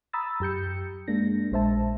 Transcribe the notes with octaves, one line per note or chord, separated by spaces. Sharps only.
A#5 B5 D#6 E6 A6
F#2 G4 G6 C#7
G#3 A#3 D4 A#6
A#1 G#3 C5 E5 A5